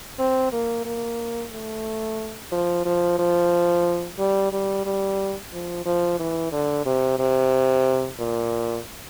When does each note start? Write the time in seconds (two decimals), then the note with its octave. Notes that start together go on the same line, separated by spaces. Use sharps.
0.19 C4
0.52 A#3
0.85 A#3
1.52 A3
2.51 F3
2.85 F3
3.19 F3
4.19 G3
4.52 G3
4.86 G3
5.53 F3
5.86 F3
6.19 E3
6.52 D3
6.86 C3
7.19 C3
8.19 A#2